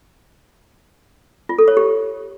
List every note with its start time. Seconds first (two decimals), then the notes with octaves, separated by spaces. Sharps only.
1.49 F4
1.58 A4
1.68 C#5
1.77 G4